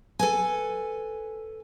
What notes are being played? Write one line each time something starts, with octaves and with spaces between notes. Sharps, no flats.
A4 B4 G#5